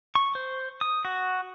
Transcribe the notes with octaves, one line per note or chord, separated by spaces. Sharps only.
C#6
C5
D#6
F#4